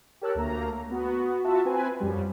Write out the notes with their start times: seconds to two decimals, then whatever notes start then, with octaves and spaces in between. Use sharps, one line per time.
0.21 G4 A#4 C#5 A5 E6 F#6
0.35 D2 A3 A#3 A#5
0.90 B3 F#4
1.44 F4 F#4 E5 A5
1.65 C4 B4 G#5
2.00 F#2 F3 G3